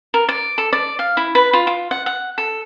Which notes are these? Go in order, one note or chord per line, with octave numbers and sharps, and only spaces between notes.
A#4
D5
A4
D5
F5
E4
B4
F4
F4
F#5
F#5
A4